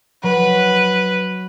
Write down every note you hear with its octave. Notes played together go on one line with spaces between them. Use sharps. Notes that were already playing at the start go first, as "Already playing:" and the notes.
F#3 B4